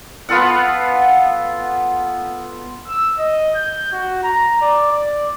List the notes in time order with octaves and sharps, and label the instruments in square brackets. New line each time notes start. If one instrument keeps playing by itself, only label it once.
[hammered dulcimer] B3 F4 A4 F#5
[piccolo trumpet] E6
D#5
G6
F#4
A#5
D5
D5